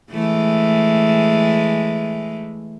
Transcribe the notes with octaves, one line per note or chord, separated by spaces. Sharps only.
E3 G#3 A3